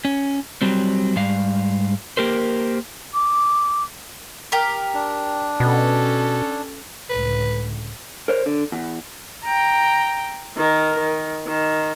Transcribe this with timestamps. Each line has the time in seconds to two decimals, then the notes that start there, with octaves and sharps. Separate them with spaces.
0.05 C#4
0.62 F#3 G3 C4
1.16 G#2 G3 F5
2.17 A#3 G4 A#4 C5
3.14 D6
4.52 G4 A#4
4.94 D4
5.60 B2 C#4 A4
7.10 C#2 A2 D3 B4
8.28 A#4 C5 C#5
8.46 D3
8.72 E2
9.44 G5 A#5
10.57 D#3 A#4
10.99 D#3
11.47 D#3